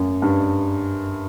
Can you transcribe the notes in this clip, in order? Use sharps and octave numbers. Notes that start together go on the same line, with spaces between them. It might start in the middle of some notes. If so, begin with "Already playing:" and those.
Already playing: F#2
G2